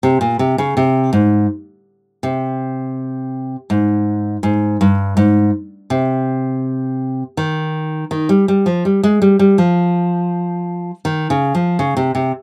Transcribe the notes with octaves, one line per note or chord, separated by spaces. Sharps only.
C3
A#2
C3
C#3
C3
G#2
C3
G#2
G#2
G2
G#2
C3
D#3
D#3
G3
G3
F3
G3
G#3
G3
G3
F3
D#3
C#3
F3
C#3
C3
C3